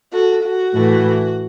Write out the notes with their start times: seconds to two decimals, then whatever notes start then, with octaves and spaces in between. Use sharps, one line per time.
0.12 F#4 A4
0.43 F#4
0.74 A2 E3 A3